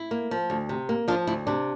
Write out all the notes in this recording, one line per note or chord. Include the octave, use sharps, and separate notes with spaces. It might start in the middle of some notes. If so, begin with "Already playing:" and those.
Already playing: E4
A#3
F3
D2
C3
A#3
F3 D4 F4
D2 E4
C3 D4